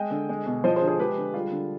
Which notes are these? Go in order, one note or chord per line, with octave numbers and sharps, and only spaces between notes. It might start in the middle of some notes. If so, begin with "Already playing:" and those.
Already playing: G#3 D#5 G5
D3
G#3
B2
F3 C5 D#5
G#4 C5
D3
G#4 C5
G#3 G4 B4
D3
G3 F4 G#4
D3